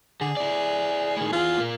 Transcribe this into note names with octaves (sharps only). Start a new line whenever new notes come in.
D3 G#4
E4 D5
A2 D#3
E3 F4 G#4
A#2 A#3